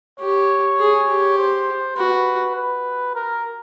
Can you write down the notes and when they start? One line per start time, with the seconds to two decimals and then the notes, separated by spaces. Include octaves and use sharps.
0.19 G4 C#5
0.79 G#4
1.09 G4
1.38 C5
1.96 F#4 B4
2.55 B4
3.15 A#4